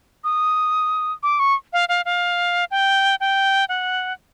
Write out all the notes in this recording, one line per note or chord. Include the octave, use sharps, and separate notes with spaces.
D#6
D6
C#6
F5
F5
F5
G5
G5
F#5